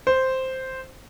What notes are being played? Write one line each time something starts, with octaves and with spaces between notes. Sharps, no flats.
C5